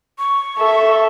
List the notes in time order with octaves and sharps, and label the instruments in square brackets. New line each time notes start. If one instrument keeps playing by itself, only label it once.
[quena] C#6
[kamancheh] A4 E5